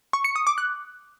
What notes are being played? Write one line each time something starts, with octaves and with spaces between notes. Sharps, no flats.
C#6
C#7
D#6
D6
F#6